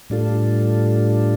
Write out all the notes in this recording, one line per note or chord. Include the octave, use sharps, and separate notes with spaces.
A2 G3 D4 F4 A4